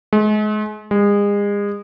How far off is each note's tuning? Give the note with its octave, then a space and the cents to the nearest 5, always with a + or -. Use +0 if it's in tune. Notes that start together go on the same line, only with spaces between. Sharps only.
G#3 +35
G#3 -35